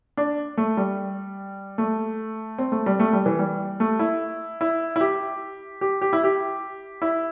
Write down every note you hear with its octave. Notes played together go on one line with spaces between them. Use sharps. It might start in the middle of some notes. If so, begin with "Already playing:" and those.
D4
A3
G3
A3
C4
A3
G3
A3
G3
E3
G3
A3
E4
E4
E4
G4
G4
G4
E4
G4
E4